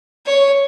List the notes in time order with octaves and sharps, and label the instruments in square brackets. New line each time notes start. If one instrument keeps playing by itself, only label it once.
[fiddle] C#5